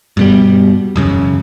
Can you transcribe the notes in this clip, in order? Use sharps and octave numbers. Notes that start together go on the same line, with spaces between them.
G2 B2 G3
E1 F#2 C#3